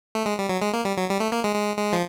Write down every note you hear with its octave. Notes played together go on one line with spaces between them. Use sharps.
A3
G#3
G3
F#3
G#3
A#3
G3
F#3
G3
A3
A#3
G#3
G#3
G#3
F3